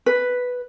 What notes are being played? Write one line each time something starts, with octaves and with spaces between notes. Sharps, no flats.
B4